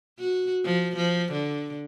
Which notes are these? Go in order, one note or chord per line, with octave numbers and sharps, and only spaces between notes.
F#4
F3
F3
D3